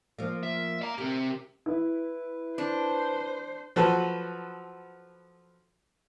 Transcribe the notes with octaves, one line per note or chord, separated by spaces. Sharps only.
F3 A#3
E5
F5 A#5
C4 G4 A#4
E4 B4
D4 C5
F3 F#3 F#4 A4 B4